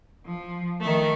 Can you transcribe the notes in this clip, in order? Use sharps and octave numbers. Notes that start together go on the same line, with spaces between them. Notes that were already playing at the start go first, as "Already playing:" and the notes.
F3
D#3 A3